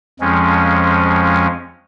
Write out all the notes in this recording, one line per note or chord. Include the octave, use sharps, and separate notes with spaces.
F2 F3 G#3 C#4